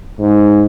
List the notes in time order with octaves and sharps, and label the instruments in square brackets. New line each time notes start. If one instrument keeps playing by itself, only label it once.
[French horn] G#2